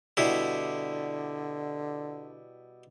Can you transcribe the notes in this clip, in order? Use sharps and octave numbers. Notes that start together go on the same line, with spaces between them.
B2 D3 G3 E4